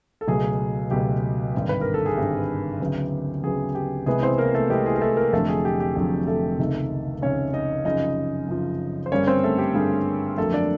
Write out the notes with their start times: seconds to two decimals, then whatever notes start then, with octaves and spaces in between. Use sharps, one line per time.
0.21 A4
0.27 C#2 B2 F#3 A3 G#4
0.91 C#2 B2 F#3 A3 G4
1.54 G#1 G2 D3
1.69 B4
1.81 A#4
1.94 A4
2.06 G#4
2.17 G#1 G2 D3 G4
2.81 D2 C#3 F#3 B3
3.43 D2 C#3 F#3 B3 G#4
3.75 G4
4.06 C2 C3 E3 G#3 B3 G#4
4.22 C4 C5
4.38 A#3 A#4
4.54 A3 A4
4.70 C2 C3 E3 G#3 B3 G4
4.86 G#4
4.96 A#4
5.01 A3 A4
5.17 A#3 A#4
5.32 F1 F2 D3 F#3 A3 A4
5.48 G#4
5.65 G4
5.80 G4
5.96 F1 F2 D3 F#3 G#4
6.27 A3 A4
6.59 C#2 C3 D#3
7.22 C#2 C3 D#3 C#4 C#5
7.53 D#4 D#5
7.85 F#2 C#3 F3 D#4 D#5
8.48 F#2 C#3 F3
9.06 C5
9.12 G2 D3 G3 A#3 C#4 C#5
9.27 C4 C5
9.44 A3 A4
9.58 G4
9.74 G2 D3 G3 A#3 G#4
10.38 F2 D3 F#3 A3 A#3 A4
10.53 D4 D5